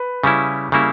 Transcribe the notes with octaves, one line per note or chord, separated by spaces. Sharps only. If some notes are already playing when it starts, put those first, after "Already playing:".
Already playing: B4
C#3 G3 C#4 E4
C#3 G3 A#3 E4